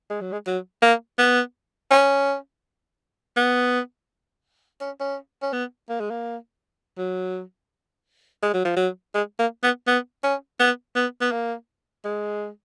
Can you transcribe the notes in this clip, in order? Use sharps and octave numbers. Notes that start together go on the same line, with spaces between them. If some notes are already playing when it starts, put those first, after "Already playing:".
G#3
F#3
G#3
F#3
A#3
B3
C#4
B3
C#4
C#4
C#4
B3
A#3
G#3
A#3
F#3
G#3
F#3
F3
F#3
G#3
A#3
B3
B3
C#4
B3
B3
B3
A#3
G#3